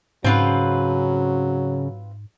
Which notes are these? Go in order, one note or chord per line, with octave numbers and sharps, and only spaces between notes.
G#2 C#3 F#3 C4 C#4 F4 B4 F#5